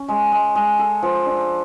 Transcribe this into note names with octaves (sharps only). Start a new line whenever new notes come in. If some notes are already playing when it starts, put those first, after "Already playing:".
Already playing: C#4
G#3
G#3
G#3
A4
F3
D4